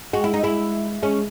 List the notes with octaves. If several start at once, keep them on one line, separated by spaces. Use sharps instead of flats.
G#3 F#4
E4
D#4
G#3 E4
G#3 C#4